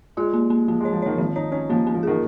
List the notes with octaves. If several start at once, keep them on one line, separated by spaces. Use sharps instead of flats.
G#3 F4
A#3
A#3
F3 A#3
G#3 C#5
F3
D#3 C#5
D#3 F3
D#4 C#5
C#4 C#5
F3 A#3
A#3
F3
D#3 G#4